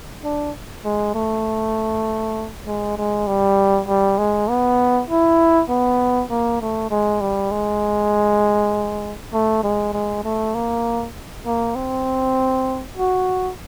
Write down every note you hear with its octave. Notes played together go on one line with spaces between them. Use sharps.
D4
G#3
A3
G#3
G#3
G3
G3
G#3
B3
E4
B3
A#3
A3
G#3
G3
G#3
A3
G#3
G#3
A3
A#3
A#3
C4
F#4